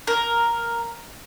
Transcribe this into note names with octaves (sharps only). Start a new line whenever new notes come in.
A#4